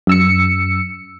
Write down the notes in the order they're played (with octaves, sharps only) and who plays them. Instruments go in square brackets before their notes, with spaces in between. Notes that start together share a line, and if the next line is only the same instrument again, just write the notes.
[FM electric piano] F#2 E6 C#7